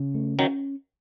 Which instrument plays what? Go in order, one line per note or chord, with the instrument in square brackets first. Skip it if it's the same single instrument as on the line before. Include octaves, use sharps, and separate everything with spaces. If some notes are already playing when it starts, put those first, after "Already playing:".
Already playing: [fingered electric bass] C#3
A3
[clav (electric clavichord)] D#3 F#3 [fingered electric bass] C#4